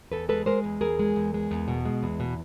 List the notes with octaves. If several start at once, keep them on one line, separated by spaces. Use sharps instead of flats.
E2 A4 B4
G#3 A4 B4
G#3 A#4 C5
E2
E2 G#4 A#4
G#3
E2
G#3
E2
B2
G#3
E2
B2